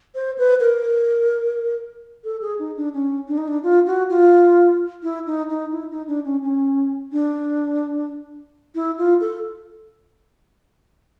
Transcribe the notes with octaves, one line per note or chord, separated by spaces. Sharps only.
C5
B4
A#4
A4
G#4
D#4
D4
C#4
D4
D#4
D4
F4
F#4
F4
E4
D#4
D#4
E4
D#4
D4
C#4
C#4
D4
E4
F4
A4